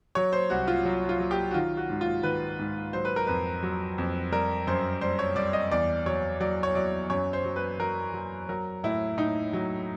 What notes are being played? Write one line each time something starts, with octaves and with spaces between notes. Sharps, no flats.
F#3 C#5
C5
C2 F#4
F4
F#3
F4
F#3
G4
F#4
D#3 F4
F#4
G#2
F4
D#3 B4
G#2
F#3 C5
B4
A#4
F2 B4
F#3
F2
G3 A#4
F#2 C5
G3 C5
C#5
G3 D5
D#5
E2 D5
F#3 C#5
F#3 D5
C#5
F#3 D5
F#2 C#5
C5
F#3
B4
F#3 A#4
F#3
F#3 A#4
A2 E4
A2 D#4
F#3